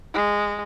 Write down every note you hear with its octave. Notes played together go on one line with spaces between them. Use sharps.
G#3